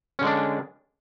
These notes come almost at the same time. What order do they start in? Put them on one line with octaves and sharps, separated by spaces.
C#4 D3 G#3 D4